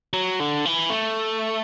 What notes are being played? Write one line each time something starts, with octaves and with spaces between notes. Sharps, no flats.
F#3
D3
E3
A3